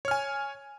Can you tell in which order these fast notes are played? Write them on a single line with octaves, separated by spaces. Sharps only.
C#5 F6 G#5